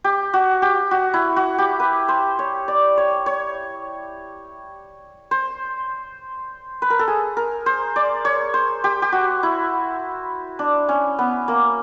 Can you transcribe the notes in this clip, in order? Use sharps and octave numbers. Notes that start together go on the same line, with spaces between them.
G4
F#4
G4
F#4
E4
F#4
G4
B4
C5
C#5
D5
C#5
C#5
C5
B4
A#4
A4
G#4
A#4
C5
D5
C#5
C5
G4
G4
F#4
E4
D4
C#4
B3
A#3